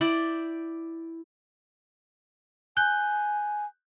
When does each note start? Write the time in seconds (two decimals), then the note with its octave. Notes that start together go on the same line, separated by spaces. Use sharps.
0.01 E4 D5 G5
2.77 G#5 F#6 G6 G7